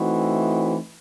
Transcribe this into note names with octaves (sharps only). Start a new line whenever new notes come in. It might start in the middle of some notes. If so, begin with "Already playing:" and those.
Already playing: E3 A3 C4 D#4 F#4